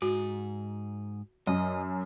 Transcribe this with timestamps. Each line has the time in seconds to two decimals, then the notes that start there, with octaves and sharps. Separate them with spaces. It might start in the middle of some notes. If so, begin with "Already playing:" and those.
0.02 G#2 F#4 G#4
1.47 F#2 D#5